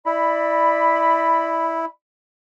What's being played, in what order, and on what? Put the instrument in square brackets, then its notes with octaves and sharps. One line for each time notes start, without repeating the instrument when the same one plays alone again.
[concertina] E4 [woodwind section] D5 B5